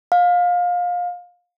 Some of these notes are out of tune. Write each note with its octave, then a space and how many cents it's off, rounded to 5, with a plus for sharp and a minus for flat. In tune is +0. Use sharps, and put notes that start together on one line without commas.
F5 +25